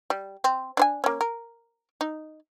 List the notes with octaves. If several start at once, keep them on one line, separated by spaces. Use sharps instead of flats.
G3
C4
D4 C5 G#5
A#3 C#4
A#4
D#4